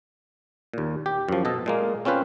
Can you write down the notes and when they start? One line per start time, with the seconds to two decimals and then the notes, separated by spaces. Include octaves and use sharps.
0.73 D#2 A#2
1.06 G4
1.29 F#2 F3
1.45 B2 A4 D#5
1.66 A#2 G#3 A#3
2.05 C4 C#4 F4 B4 C5